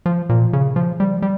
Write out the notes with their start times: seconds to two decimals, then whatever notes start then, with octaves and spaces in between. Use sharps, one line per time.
0.06 F3
0.29 A#2
0.53 C#3
0.76 F3
1.00 G3
1.22 G3